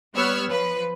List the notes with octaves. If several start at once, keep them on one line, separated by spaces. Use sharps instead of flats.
G3 B3 C#5 E6 F6
F3 B4